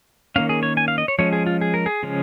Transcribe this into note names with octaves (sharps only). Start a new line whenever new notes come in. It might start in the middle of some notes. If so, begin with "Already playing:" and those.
D#3 A#3 C#4 F5
G#4
C#5
G#5
F5
D#5
C#5
F3 G#3 C#4 C#5
G#4
F4
G#4
A#4
G#4
C#3 F3 G#3 C#4